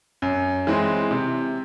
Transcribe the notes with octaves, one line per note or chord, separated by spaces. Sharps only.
F#2
E3 G#3 C4
C3